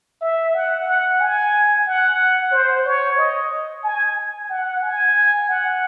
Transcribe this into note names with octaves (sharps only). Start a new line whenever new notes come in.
E5
F#5
F#5
G#5
F#5
C5
C#5
D#5
G#5
F#5
G#5
F#5